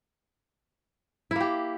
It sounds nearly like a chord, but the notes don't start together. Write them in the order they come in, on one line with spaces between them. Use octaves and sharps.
E4 A#3 G4